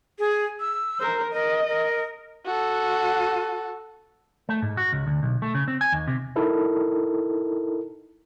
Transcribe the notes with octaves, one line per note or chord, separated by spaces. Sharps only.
G#4
E6
A#4 C5
A#4 D#5
A#4
F#4 A4
A3
G#2
F#4
C#2
D2
B1
A3
C#3
C4
G#5
D#2
C3
D#4 E4 A4 A#4